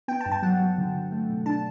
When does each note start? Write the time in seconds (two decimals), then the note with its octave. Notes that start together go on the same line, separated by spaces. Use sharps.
0.08 B3 G5
0.21 A5
0.26 G2
0.32 A5
0.43 F#3 F#5
0.60 F#3
0.78 D3
0.95 D3
1.12 A3
1.30 B2
1.46 D4 A5